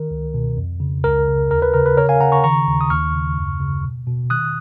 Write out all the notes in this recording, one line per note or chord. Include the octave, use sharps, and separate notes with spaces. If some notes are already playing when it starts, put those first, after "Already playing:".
Already playing: D#3 A#4
C#2
B2
F2
C#3
C#2 A#4
C#3
D#2 A#4
B4
C#3 A#4
B4
C#3 A#4 C#5
F5 G#5
C#3 F#5 A#5
A#5 C#6
D#3 A#5 C#6
D#2
D#6
D#2 C#6 F6
C#3
F#2
C#3
B2
B2
D#3 D#6 F#6